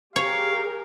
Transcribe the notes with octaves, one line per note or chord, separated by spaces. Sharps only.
G4 G#4 A#4 C#5 F5